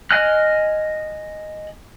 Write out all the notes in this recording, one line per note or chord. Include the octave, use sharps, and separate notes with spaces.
D#5 G#5 F6 F#6